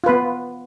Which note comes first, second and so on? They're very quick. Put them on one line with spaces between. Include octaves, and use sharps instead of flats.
F4 B4 B3